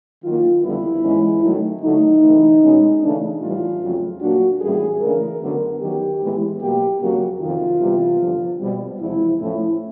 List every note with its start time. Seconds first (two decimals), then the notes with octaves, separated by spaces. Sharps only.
0.23 D#3 F#3 A#3 F4
0.62 F2 D3 G3 B3 E4
1.03 G#2 E3 G#3 C#4
1.42 D#3 F#3 A3
1.82 D3 F#3 A3 D#4
2.22 E2 C3 E3 A3
2.62 B2 G#3 C#4
3.02 C#3 E3 A3 D4
3.41 A2 E3 G3 F4
3.81 F2 C#3 F#3 A3
4.21 A#2 F#3 A#3 D4 F#4
4.61 A2 E3 G3 A#3 C#4 G#4
5.01 C#3 E3 A3 D4 A#4
5.41 F#2 D3 F#3 B3
5.80 D#3 F#3 B3 G4
6.20 A2 E3 G#3 B3
6.60 B2 F#3 A#3 G4
7.00 F2 C#3 F#3 A#3 F#4
7.40 F2 C3 D#3 F4
7.79 C3 E3 G3 B3
8.19 G2 D3 F3
8.60 B2 G3 C4
8.99 E2 C3 F3 G#3 E4
9.39 A2 F3 A3 C#4 E4